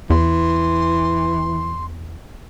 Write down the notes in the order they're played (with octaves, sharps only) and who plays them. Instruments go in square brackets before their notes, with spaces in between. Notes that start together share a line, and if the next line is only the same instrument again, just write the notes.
[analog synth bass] E2 [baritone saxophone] E3 [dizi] C6